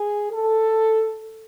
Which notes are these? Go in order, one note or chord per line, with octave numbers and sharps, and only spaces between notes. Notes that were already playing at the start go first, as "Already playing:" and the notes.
Already playing: G#4
A4